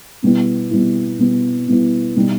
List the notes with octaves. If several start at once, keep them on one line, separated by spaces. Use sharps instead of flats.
B2 G3 B3 E4
B2 G3 B3 E4
B2 G3 B3 E4
B2 G3 B3 E4
B2 G3 D#4